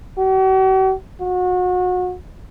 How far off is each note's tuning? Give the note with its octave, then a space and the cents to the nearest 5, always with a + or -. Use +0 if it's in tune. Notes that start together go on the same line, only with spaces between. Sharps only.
F#4 +45
F#4 -30